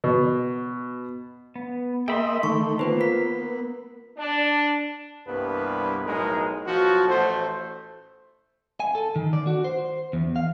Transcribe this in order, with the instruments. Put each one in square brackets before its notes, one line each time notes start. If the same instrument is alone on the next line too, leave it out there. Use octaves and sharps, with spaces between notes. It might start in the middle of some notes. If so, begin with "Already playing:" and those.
[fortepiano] B2
[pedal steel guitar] B3
[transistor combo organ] A#3 D#5 E5 [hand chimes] G#4 [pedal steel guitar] G5 B5 C6
[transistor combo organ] D#3 A3 [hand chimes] C#6
[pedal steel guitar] A#3 [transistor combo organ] B3 [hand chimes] F4 B4 C5
[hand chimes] A#4 B6
[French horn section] D4
[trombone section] C2 G2 A#3 B3 B4
B1 A2 G#3 D#4 A#4
B1 F3 F4 F#4
A1 A3 C5
[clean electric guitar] G#5
A4
D#3
D5
F#4
C5
E2
F5